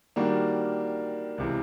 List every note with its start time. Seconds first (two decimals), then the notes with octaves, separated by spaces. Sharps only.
0.16 D#3 G3 A#3 D4 F#4
1.38 C#2 C3 E3